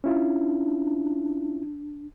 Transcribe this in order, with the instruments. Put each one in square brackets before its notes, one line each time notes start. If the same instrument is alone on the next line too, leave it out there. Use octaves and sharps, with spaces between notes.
[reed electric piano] C#4 E4 F4 [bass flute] D4